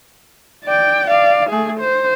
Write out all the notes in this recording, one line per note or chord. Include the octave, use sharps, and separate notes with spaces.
D5 G5
D5 F5
A3 G#4
C5